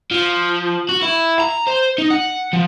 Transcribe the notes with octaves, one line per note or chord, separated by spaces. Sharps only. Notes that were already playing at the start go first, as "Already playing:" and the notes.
F3
F#4
E4
A#5
C5
D#4
F#5
F3